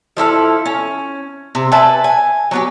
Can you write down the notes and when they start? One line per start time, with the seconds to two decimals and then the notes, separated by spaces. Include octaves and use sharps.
0.17 F3 E4 A4 F5
0.66 C#4
1.55 C3
1.72 B4 E5 G#5 A5
2.04 G#5
2.51 F#3 B3 G4